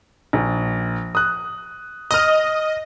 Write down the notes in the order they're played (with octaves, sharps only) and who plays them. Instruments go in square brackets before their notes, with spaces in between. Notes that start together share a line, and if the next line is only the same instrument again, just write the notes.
[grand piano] A#1
D#6 F#6
[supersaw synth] D#5 [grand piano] D#6 F6